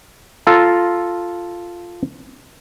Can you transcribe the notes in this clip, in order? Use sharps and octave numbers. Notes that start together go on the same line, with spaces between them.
F4 A4 A#5